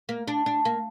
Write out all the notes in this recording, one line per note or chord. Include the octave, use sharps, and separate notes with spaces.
A#3
D4
D4
A#3